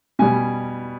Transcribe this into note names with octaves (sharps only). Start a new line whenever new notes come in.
B2 G3 G#5